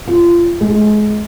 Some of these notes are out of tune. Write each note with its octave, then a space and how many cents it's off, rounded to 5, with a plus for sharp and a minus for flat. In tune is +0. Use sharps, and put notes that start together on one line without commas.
F4 -25
G#3 +30